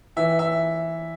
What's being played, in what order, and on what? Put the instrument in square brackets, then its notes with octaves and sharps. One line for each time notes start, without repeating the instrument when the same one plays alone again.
[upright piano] E3 E5
E5